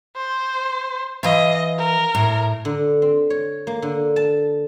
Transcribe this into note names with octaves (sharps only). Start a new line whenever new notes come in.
C5
E3 D#5 F5
A#4
A2
D3
C4
C#5
A#3
D3
A5